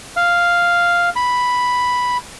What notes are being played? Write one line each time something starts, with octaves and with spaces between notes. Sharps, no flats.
F5
B5